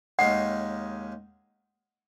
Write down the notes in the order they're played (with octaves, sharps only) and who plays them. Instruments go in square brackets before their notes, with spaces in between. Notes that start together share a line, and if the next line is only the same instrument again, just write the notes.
[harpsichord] D#2 D#3 G#3 C#4 [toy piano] F#5